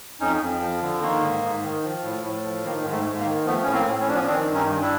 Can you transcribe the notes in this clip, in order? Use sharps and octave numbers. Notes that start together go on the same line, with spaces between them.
F2 C#4 D#4
F2
F3
D3
D#3 A#3
G#2
G#2
D#3
F3
A2
A2
F3
D#3 A#3
G#2
A3
G#2
A#3
D#3
F3 A3 B3
A2 C#4
A#3 C4
A2
C#4
F3 D4
B3 C#4
D#3 C4 D4
G2
C#4 D#4
G2
D4 E4